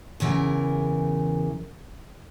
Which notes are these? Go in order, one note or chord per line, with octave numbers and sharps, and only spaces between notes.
E2 C#3 E3 A#4